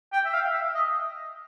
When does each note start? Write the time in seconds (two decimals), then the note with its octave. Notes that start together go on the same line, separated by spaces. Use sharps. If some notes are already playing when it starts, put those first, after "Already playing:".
0.13 G5
0.25 E5
0.33 F5
0.54 E5
0.75 D#5